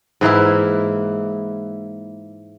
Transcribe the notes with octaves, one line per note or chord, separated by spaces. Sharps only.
G#2 E3 A#3 E4